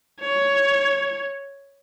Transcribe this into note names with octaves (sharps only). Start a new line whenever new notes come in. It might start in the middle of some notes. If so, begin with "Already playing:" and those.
C#5